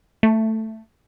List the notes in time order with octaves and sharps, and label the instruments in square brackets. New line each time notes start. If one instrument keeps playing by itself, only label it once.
[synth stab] A3